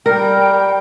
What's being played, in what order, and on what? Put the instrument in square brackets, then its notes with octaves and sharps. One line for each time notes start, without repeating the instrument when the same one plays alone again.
[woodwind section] G3 G5 [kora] A#4